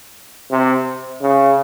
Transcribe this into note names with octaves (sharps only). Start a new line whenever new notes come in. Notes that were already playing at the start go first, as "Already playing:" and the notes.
C3
C#3